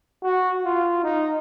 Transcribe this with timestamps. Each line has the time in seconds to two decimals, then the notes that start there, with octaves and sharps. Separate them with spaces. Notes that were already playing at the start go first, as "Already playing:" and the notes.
0.23 F#4
0.65 F4
1.04 D#4